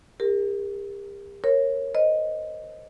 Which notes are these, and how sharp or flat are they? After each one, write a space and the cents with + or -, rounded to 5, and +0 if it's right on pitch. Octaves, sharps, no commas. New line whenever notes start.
G4 +40 A#4 +0
A#4 +0 C#5 -15
C5 -15 D#5 +0